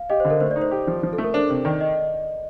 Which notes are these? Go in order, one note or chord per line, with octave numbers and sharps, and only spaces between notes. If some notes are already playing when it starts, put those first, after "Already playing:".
Already playing: F5
G4 D#5
D3 C5
A#4
A3 C5
D5
D#4
C5
G4
F3
F3
A4
A3
A#4
D4 C5
C3
D#3 D5
D#5